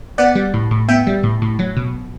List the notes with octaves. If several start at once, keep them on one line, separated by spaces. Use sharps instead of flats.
B3 D5 F#5
G3
A2
A2
B3 E5 G5
G3
A2
A2
F#3
B2